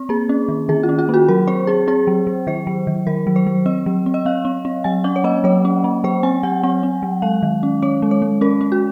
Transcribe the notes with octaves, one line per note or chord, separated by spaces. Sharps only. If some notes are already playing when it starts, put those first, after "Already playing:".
Already playing: C4
A#3 G#4
C#4
D#3
D#3 G#4
F4
C#4
F4
A#3 F#4
F#3 A#4
C4 C5
C4 G#4
C4 G#4
F#3
F#3
D#3 C5
F#3
D#3
D#3 A#4
F#3
C5
F#3
C4 D#5
F#3
C4
D#5
C4 F5
C4
C4
F#3 G#5
C#4 F#5
C#5
A#3 D#5
F#3 C#5
C#4
A#3
F#3 C5
C4 G#5
F#3 F#5
C4 F#5
C4
F#3
G#3 F5
D#3
C#4
C#4 C#5
G#3
C#5
G#3
C#4 A#4
C#4
F#4